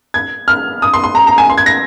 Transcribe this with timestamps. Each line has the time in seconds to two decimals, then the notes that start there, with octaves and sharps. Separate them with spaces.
0.14 G#6
0.48 F6
0.82 D#6
0.94 C6
1.04 C6
1.15 A#5
1.27 A#5
1.38 G#5
1.50 C6
1.58 G#6
1.66 A#6